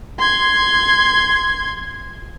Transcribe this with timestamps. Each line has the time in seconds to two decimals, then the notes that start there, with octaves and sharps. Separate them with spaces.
0.18 C6 G#6